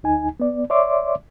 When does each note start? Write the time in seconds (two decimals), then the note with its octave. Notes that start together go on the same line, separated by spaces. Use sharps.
0.03 D2 D#4 G#5
0.40 B3 D5
0.70 C#5 D5 E5 C6 D6